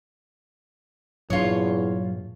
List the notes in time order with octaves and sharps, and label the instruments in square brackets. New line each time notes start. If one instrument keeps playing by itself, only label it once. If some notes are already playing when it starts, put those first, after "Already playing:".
[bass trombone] E2 [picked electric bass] G2 A#2 D4 [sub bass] F#3 [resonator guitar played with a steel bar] F4 C#5